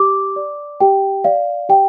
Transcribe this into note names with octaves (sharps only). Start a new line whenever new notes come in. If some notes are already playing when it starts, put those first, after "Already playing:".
Already playing: G4 D6
D5
G4 G5
D5 F5
G4 G5